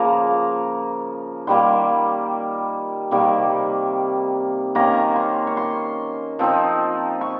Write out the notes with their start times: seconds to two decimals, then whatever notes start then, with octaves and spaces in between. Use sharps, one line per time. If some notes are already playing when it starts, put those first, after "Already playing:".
Already playing: C#3 F3 A#3 A#5
1.47 D#3 G3 A#3 C6
3.11 C3 D#3 G3 A#3
4.75 D#3 A#3 C#4 A#5
5.16 C6
5.47 C#6
5.57 C6
6.39 F3 C4 D#4
7.21 C#6